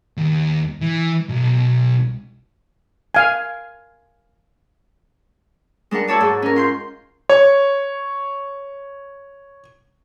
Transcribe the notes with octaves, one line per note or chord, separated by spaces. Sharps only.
D#2
E3
B1
F5 G#5
G#3 D4 A#4 F#5
E4 F#4 C#5 A5 D6
G#2
C#4 A#4
F4 C6 G6
C#5 C#6